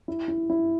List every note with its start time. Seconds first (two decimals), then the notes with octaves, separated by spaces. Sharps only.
0.08 E4
0.28 E4
0.50 E4